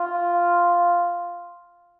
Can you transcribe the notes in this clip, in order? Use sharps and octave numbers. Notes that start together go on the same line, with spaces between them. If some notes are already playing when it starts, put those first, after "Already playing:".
Already playing: F4